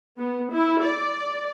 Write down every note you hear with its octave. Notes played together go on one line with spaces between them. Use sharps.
B3
E4
D5